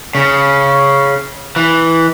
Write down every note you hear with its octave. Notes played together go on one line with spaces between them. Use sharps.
C#3
E3